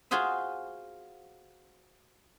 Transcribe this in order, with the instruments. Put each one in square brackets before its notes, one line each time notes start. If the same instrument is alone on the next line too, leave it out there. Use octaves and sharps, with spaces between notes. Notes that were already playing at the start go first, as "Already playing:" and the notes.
[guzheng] F4 F#4 G#4 C5 E5